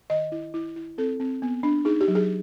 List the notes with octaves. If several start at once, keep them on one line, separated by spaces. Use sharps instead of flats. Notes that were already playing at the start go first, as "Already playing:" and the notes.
D#3 D#5
E4
E4
E4
C4 A4
C4
B3
D4
D#4 G#4
G4
F#3
G#4